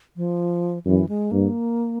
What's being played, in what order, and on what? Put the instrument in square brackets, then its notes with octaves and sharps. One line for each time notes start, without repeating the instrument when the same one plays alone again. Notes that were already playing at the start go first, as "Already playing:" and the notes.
[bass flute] F3
[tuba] F#2 [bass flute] E3
[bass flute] G#3
[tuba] G2 [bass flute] A#3